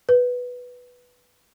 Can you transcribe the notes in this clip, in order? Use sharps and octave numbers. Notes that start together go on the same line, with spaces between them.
B4